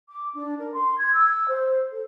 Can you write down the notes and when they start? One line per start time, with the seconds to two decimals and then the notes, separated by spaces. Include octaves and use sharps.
0.08 D6
0.34 D4
0.59 A#4
0.74 C6
0.98 G#6
1.14 E6
1.49 C5
1.90 A4